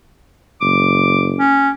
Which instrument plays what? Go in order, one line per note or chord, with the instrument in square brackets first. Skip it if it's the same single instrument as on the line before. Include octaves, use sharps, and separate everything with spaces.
[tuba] F#1 [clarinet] D6
[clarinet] C#4